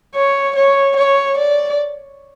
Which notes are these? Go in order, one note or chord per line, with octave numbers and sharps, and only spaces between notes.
C#5
C#5
C#5
D5